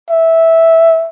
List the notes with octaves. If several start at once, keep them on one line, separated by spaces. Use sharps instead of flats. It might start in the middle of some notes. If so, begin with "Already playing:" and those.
E5